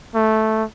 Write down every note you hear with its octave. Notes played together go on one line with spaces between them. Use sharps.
A3